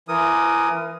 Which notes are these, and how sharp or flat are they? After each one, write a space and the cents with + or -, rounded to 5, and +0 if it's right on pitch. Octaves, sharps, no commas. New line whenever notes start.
E3 +25 A#4 +0 D#6 +0